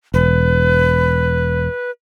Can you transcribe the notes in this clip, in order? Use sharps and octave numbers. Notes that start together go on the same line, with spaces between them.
E1 B4